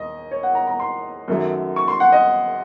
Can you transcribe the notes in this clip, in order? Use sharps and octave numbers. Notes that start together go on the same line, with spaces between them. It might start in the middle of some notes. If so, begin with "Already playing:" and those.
Already playing: D#2 D#5
C#5
F#5
A#5
A#5
C6
F#2 D#3 F#3 A3
C#6
C6
F#5
D#5